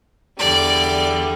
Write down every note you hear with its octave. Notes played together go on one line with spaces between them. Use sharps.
E2 D3 G3 D5